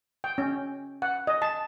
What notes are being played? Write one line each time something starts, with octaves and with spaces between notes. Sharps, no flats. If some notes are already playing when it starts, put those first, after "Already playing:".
G5
C#4
F#5
D#5
A5